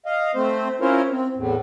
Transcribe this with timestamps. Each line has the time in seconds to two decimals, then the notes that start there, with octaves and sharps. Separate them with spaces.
0.06 D#5 F5
0.35 A3 C4 C5
0.81 C#4 E4 F4 A#4 C5 C#5
1.11 C4
1.36 E2 A2